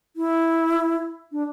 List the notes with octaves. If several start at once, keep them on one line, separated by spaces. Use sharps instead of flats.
E4
D4